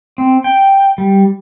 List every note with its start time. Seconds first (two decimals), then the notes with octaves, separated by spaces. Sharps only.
0.18 C4
0.44 G5
0.98 G3